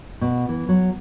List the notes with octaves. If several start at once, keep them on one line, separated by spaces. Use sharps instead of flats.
B2
E3
F#3